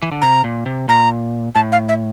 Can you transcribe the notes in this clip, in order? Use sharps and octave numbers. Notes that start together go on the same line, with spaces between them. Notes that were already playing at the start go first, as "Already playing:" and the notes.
E3
D3
C3 A#5
A#2
C3
A#2 A#5
A2 A5
F5
E5